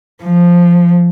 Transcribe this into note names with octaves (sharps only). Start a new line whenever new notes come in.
F3